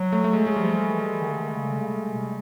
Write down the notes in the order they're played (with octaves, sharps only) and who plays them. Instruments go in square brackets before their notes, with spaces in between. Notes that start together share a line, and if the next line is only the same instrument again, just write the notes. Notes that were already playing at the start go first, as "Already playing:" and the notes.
Already playing: [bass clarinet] F#3
[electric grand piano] A3
A3
G#3
G#3
[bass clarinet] F3 [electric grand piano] G3
[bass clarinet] E3
D#3
D3
D#3
D3
C#3
C#3
C3
B2
C3